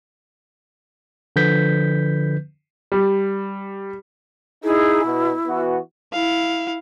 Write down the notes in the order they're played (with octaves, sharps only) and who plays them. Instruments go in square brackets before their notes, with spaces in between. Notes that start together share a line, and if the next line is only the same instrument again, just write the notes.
[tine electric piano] D3 F3 B4 G6 B6
[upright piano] G3
[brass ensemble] D#4 G#4 [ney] E4
[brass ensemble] B2
E3 B3 F#4
[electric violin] E4 F5